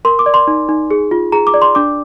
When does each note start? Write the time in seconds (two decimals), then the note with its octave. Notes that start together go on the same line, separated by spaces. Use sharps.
0.05 A#4 C6
0.19 D6
0.26 D5
0.34 C6
0.47 D#4
0.69 D#4
0.91 G#4
1.11 F4
1.32 G#4 A#5
1.47 D6
1.54 D5
1.62 C6
1.75 D4 D6